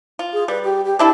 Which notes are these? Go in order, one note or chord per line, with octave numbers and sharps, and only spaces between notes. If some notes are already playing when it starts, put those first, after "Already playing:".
F4
G#4
G3 B4
G4
G4
D4 E4 G4 A4